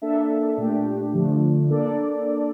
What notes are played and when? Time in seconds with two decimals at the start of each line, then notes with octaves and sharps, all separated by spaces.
0.02 A#3 D4 A4 E5
0.57 A#2 A3 D4 G4
1.13 D3 F3 A3 D4
1.69 A#3 D4 A4 D5